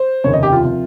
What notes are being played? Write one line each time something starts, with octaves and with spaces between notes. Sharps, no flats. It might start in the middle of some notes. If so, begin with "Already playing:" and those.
Already playing: C5
F1 D#2 C#3 C#5
D#5
G4
F4
C3 F3